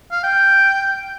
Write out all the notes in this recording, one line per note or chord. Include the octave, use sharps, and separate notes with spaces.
F5
G5